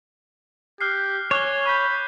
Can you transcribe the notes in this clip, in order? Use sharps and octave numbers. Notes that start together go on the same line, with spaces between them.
G4 F6 F#6 C7
C#5 G#5 D6 F#6 G7
B5 C#6 G6